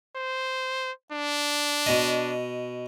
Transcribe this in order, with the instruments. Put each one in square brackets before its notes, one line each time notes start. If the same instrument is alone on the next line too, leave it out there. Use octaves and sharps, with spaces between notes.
[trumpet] C5
D4
[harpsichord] B2 D#5